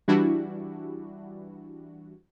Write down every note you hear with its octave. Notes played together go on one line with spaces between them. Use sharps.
E3 G3 D4 E4 F#4